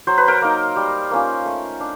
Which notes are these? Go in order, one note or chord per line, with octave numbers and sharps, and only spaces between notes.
F#3 C5
B4
A#4 C5
A#3 D#4
G3
A#3 C#4 F4
A3
D4